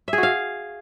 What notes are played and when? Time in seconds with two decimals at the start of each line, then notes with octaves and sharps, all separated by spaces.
0.08 E5
0.13 G#4
0.18 F#4
0.23 F5